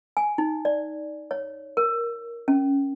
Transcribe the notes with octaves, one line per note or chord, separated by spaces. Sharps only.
G#5
D#4
D5
C#5
A#4
C#4